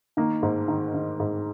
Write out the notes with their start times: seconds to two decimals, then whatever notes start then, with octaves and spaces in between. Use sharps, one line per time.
0.17 D#3 A#3
0.43 G#2
0.68 D#3
0.94 D#3
1.20 G#2